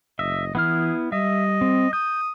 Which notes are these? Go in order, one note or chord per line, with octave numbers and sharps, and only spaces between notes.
F#1 D#5 E5
E3 B3 E4 G#4 F6
G3 D#5 E5
C4
D#6 G6